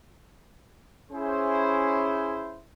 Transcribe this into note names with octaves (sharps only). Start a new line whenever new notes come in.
C#4 E4 G#4 C5